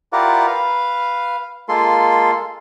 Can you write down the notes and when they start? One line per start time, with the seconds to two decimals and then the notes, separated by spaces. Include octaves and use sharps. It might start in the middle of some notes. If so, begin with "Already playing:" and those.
0.13 E4 F4 G4 A#4 D5 F#5
0.47 B4 F5
1.69 G#3 A#3 F4 A4 C6